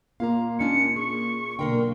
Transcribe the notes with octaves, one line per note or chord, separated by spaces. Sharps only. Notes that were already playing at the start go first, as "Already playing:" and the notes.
A#2 A#3 F5 A#5
G#3 C#4 D4 C#7
G#4 C#6
B1 A#2 D3 A#3 A#4 G5 C6